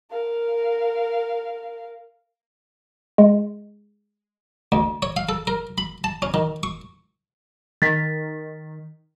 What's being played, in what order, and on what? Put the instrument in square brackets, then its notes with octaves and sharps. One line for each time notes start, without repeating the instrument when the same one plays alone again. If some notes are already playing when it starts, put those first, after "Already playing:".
[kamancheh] A#4 F5
[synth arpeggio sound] G#3
[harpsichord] D2
C#5
F5
A4
A#4
B5
A5
C#4
D#3
C#6
[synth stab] D#3 [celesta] A6 B6